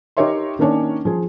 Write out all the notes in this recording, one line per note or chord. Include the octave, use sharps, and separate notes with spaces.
D#4 G4 A#4 C#5 E5 C6
D#3 A#3 C#4 D4 C#5
F3 G#4